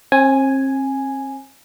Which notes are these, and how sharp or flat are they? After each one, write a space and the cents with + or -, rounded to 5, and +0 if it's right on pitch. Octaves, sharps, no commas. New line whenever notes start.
C4 +40 G#5 +0